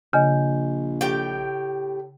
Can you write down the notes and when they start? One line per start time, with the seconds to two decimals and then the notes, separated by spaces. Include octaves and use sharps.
0.13 A#1 C#3 D#5 G#5 G6
1.01 A2 G4 G5